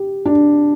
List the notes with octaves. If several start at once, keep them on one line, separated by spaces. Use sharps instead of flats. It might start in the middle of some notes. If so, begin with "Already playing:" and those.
Already playing: G4
D4